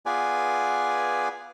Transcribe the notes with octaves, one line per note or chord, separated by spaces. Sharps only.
B3 F4 G#4 B4 D5 G#5